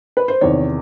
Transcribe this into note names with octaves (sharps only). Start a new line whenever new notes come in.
B4
C5
E2 C3 D#3 C#5